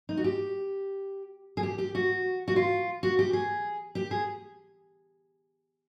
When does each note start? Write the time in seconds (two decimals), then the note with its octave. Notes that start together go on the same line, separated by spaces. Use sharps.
0.09 D#4
0.17 F#4
0.24 G4
1.57 G#4
1.63 G4
1.78 G4
1.95 F#4
2.48 F#4
2.56 F4
3.03 F#4
3.19 G4
3.33 G#4
3.95 G4
4.11 G#4